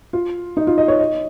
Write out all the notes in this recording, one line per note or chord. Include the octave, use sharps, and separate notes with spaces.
F4
D#4
F4
D#5
C#5
D#5